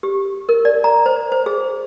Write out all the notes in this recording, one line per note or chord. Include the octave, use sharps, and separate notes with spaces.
G4
A#4
D5
A#5
C5
C5
G#4